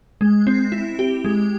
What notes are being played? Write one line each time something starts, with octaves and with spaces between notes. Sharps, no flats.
G#3
C4
E4
G4
G#3